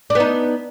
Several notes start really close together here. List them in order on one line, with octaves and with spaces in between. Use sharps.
D4 B3 D#4